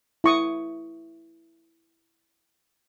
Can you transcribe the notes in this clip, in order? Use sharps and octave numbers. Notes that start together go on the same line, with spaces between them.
E4 C#6 D#6